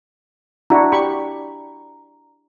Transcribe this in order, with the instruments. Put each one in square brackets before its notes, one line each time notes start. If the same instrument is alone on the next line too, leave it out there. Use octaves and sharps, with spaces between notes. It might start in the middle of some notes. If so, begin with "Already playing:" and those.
[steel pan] D4 E4 F#4 [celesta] A#5
[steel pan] G4 B5 C#6